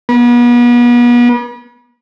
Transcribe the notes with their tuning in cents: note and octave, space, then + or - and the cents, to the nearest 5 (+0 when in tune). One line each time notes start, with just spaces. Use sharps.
B3 -40